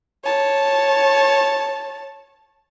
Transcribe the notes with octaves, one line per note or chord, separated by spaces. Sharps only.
C#5 A5